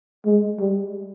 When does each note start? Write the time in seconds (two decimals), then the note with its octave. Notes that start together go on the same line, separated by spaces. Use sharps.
0.25 G#3
0.59 G3